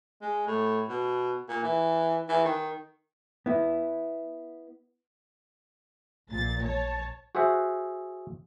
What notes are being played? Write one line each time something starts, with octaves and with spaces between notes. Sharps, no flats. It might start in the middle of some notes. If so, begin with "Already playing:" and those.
G#3
A2
B2
A#2
E3
E3
D#3
B3 E4
A#1 A#2 A6
C#5 A5
F#4 G#4 C5 E5 F#5